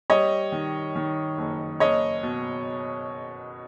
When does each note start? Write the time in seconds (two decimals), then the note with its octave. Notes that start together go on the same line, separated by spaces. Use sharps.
0.10 G3 C#5 D#5
0.52 D#3
0.96 D#3
1.38 F#1
1.80 F#1 C#5 D#5
2.23 B2